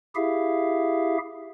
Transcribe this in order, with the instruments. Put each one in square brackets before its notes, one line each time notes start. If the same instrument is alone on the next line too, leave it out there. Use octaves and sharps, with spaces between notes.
[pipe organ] E4 G4 G#4 E5 F5